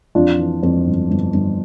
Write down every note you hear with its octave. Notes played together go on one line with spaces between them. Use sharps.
F2 D4 F4
E3
F2
G1
G1
G1